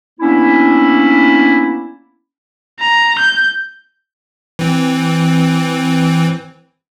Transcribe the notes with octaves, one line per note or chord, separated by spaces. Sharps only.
A#3 B3 C#4 D4 E4
A#5
G6
E3 C4